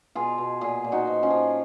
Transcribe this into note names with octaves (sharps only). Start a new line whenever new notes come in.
B2 F4 G#4
B2
A#2 F4 G#4
A#2
D#4 F#4
F3
C#4 F4
F3